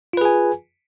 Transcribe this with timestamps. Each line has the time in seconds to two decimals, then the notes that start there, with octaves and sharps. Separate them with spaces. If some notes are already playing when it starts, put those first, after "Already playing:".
0.13 F4
0.17 B4
0.21 G#4
0.25 G#5